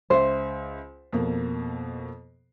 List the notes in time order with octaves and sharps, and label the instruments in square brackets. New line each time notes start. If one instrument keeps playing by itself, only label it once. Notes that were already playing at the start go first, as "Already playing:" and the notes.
[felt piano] C#2 E5 [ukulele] C5
[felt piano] F2 B2 A#3